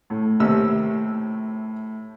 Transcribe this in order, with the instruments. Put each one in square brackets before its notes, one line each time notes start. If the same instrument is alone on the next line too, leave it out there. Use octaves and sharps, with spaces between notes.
[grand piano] A2
[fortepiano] D#2 C3 E6